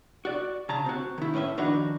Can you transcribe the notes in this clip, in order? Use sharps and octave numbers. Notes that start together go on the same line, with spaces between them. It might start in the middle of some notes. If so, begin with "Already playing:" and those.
F#4 D5
C#3 A5 A#5
C4 F#4
D#3 E4
A2 C#4 B4 D#5 E5
F2 D#3 D4 D#4 F#4 B4